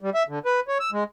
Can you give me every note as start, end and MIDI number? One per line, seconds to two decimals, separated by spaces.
0.01 0.10 55
0.15 0.23 76
0.29 0.39 50
0.45 0.60 71
0.68 0.78 73
0.80 0.90 88
0.92 1.04 56